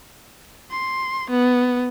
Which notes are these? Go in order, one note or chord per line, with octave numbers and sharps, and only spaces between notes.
C6
B3